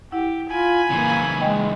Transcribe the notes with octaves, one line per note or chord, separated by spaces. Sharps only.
E4 G4 F#5
F4 G#5 B5
C#3 E3 A#3
G#3 D#5 G5 G#5